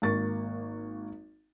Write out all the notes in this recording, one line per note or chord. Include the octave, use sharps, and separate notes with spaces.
G#1 A#3 C#6 A6